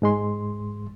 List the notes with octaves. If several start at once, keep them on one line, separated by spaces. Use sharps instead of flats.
G#2 G#3 C6